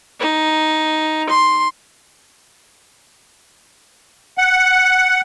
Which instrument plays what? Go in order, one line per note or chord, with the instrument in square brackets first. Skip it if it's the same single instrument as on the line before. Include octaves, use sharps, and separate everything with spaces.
[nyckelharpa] D#4
C6
[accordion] F#5